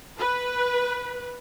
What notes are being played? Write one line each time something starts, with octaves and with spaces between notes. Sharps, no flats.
B4